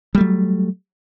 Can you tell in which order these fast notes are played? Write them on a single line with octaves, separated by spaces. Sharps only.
G3 A3 F#3